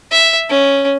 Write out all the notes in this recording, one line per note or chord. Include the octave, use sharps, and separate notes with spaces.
E5
C#4